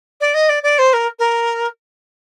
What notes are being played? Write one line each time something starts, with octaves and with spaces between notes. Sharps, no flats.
D5
D#5
D5
D5
C5
A#4
A#4